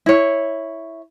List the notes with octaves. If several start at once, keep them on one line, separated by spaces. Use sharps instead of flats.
E4 C#5